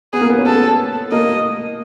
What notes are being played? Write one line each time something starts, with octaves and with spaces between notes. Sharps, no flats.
B3 G#4
A#3
B3
C#4
B3 A4
A#3 D#5